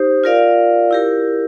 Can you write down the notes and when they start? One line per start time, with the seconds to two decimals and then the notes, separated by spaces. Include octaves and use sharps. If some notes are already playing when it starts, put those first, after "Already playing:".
Already playing: D#4 G4 C5
0.24 F4 A#4 D5 F5
0.91 E4 G4 A#4